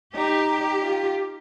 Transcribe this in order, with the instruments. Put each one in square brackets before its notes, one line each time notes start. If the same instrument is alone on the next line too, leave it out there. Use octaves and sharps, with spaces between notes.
[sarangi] D#4 [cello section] G4
[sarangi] F4